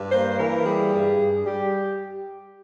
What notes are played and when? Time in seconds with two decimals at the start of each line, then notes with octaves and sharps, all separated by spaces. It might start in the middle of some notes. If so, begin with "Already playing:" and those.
Already playing: G2
0.11 A#3 C5
0.30 C5
0.38 E3 A#4
0.64 G3 G#4
0.92 G2
1.17 G2
1.44 G3 G4